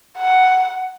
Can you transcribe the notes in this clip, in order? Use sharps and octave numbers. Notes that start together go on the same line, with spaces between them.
F#5